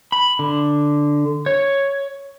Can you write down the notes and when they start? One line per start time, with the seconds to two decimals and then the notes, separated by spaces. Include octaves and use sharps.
0.12 B5
0.39 D3
1.46 C#5